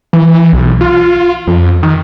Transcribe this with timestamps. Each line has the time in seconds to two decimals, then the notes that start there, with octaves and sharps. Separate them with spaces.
0.13 E3
0.53 B1
0.81 F4
1.47 F2
1.83 D#3